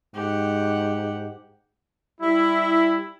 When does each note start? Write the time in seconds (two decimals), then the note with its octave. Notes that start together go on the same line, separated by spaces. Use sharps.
0.15 G#2 G4 F#5
2.20 G3 E4